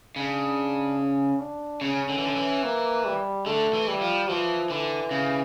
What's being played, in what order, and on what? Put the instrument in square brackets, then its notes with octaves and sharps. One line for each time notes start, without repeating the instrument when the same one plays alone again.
[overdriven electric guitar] C#3 [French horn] D4
[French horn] C#4
D4
[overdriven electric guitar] C#3 [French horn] C#4
[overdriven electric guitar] D3
E3
D3
E3
[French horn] A#3
G3
[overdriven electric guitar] D3 [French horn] A3
[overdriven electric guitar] E3
[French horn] G3
[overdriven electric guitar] F3
[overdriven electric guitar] E3 [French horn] F3
[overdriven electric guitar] D3 [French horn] E3
[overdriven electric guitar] C#3